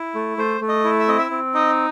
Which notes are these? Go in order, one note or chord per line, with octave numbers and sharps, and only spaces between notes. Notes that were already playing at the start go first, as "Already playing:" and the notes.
Already playing: E4
A3
A3 C5
A3
D#5
E4
E5
C4 D#5
E5
C4
D#4 D#5